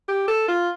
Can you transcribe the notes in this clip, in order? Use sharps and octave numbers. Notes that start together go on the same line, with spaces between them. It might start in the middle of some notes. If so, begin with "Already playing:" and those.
G4
A4
F4